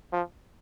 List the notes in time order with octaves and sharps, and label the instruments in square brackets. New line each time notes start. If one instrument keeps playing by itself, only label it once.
[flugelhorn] F3